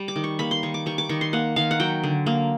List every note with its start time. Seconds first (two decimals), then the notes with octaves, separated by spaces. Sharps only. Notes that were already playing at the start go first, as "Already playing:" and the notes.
Already playing: G3
0.08 D6
0.16 D#3
0.24 C#6
0.39 A#3 B5
0.51 C6
0.63 D#3 C#6
0.74 D6
0.86 G3 C#6
0.98 D6
1.09 D#3 C#6
1.21 C6
1.33 A#3 F#5
1.56 D#3 F5
1.71 F#5
1.80 F#3 G5
2.04 D3
2.26 A#3